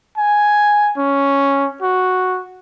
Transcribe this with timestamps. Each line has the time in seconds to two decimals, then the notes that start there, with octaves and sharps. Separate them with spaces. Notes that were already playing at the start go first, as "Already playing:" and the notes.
0.17 G#5
0.97 C#4
1.82 F#4